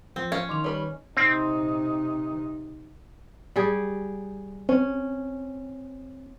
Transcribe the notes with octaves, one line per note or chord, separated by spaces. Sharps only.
F3 C4
C#4 F5 G#6
D#3 D#4 C6 D6 F7
G3 B4 C#5 C#6
C3 C4 D#4
G3 G4 G#4
C4 C#4